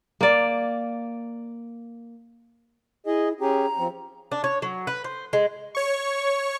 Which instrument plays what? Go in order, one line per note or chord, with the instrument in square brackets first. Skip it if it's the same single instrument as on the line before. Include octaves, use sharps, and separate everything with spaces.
[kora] A#3 D5
[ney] E4 [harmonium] G#4 D#5
[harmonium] C#4 G4 G#4 [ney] A#5
[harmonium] F3 C4
[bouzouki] D4
C#5
F#3
B4
C5
G#3
[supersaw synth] C#5 C#6